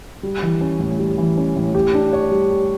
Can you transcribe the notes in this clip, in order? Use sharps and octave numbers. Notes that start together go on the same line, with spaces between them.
G3
E3
C#4
A2
G3
E3
C#4
A2
G4
D4
C#5
G3
G4